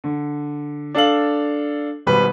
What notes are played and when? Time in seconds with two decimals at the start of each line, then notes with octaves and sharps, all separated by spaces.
0.04 D3
0.94 D4 A4 F5 F#7
2.06 G#1 B2 G3 B4 B5